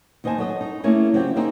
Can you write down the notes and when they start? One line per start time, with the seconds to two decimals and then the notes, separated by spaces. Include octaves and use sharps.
0.24 D#2 D#4 C5 D#5 G#5 A5
0.38 F#3 A4 D#5
0.61 D#4
0.83 A3 A#3 C#4 E4 G#4 A#4
1.13 C#3 F#3 C4 C#4 F4 G4
1.36 A#3 C4 D#4 G#4